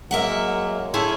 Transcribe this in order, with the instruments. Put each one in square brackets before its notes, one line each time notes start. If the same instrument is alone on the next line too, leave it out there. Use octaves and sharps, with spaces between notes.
[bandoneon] F#3 G#3 A#3 [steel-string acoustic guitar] A#4 E5 F#5
[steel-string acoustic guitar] C#4 E4 G#4 [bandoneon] A4 C#5 C6